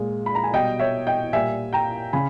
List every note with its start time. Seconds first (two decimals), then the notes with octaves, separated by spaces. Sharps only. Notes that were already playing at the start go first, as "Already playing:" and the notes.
Already playing: A#2 G#3
0.26 B5
0.35 A#5
0.44 G#5
0.53 B2 G3 D#5 G5
0.79 C#5 E5
1.07 D#5 G5
1.33 A#2 G3 E5 G#5
1.73 G5 A#5
2.13 C#3 G#5 B5